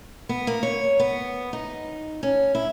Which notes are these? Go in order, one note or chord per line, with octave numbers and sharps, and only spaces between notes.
B3
A#3
C#5
B3
D#4
C#4
E4